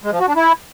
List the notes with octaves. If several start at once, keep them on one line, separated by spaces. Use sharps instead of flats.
G#3
F3
F#4
D4
E4